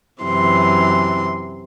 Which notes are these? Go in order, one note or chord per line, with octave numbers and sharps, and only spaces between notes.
F#2 C3 E3 C6